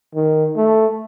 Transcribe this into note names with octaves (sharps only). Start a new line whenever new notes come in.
D#3
A3